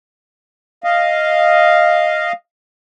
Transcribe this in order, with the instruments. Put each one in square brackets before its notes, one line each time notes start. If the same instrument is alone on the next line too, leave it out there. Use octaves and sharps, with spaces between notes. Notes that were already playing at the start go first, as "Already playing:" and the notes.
[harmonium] D#5 F5